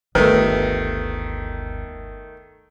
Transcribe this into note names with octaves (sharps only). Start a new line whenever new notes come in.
G1 D2 D#3 A3 B4